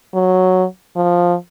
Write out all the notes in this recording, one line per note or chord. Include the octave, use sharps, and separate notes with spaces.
F#3
F3